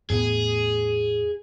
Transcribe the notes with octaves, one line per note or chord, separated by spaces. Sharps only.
E2 A2 B3 G#4